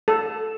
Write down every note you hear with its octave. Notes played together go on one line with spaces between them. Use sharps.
A4